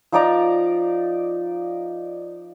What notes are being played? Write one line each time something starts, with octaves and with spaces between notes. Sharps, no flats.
F3 D#4 D5 A#5